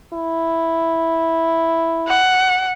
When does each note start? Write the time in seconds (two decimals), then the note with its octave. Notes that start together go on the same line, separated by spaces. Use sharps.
0.13 E4
2.08 F#5